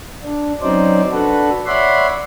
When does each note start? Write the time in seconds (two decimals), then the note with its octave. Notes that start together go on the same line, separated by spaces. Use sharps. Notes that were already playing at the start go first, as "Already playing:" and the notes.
0.23 D4
0.62 F#3 C4 C#4 D#4 C5 D5
1.12 D4 F#4 A4 B4
1.66 C#5 D5 E5 F#5 B5 C6